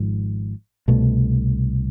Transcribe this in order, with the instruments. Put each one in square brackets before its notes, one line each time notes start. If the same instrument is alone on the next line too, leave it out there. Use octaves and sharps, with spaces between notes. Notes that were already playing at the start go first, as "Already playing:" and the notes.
Already playing: [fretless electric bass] G#1 G#2 F3
C2 B2 A3